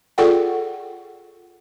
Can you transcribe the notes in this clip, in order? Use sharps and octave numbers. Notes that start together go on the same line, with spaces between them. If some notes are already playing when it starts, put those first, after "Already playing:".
F4 G#4 A4 D5 F#5 G5